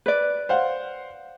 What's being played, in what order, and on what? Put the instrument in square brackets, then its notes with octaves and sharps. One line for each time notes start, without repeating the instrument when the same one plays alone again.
[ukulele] B4 D5
[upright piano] C5 F5 F#5